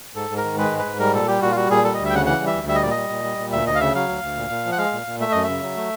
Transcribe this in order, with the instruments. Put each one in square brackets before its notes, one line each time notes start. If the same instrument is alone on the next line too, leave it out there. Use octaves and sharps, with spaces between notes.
[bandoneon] G#2 A4
G#2
A#4
D#3
G#3 B4
G#2
B4
G#2
G3 A#4
A#2 A4
G3 G4
A#2 F#4
F4
G3 F#4
A#2 G#4
G3 A4
D2 D#5
E5
G5
C#3 F#5
E3 F#5
G3
E5
D2
G3 E5
D#5
A#2 D5
D#5
G3
A#2
G3
A#2
D2 E5
D2 D#5
F5
C#3 E5
F#3 F5
D2
D2
A#2
A#2
F3
F#5
G#3 F5
A#2
A#2
A3 E5
F#2 D#5
E5
C#3
F#3
A3